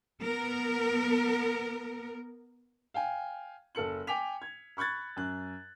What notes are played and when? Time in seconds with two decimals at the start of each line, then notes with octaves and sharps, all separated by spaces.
0.23 B3 A#4
2.94 F5 G5 G#5
3.75 F#1 A4 C#7 F#7
4.07 G5 G#5 D6 B6 F7
4.42 G#6
4.77 B5 C#6 F#6 G#6 A6
5.16 F#2 F#6